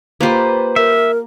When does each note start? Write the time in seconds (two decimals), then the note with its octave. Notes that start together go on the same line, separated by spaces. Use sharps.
0.21 A#3 F4 G4 B4 C5
0.76 A#4 E5